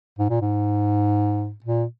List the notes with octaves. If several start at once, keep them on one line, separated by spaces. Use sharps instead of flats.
G#2
A#2
G#2
A#2